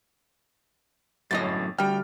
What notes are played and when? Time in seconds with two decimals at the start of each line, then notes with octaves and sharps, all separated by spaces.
1.31 G1 F#2 A2 D#5 A6
1.78 D2 G3 G5 F6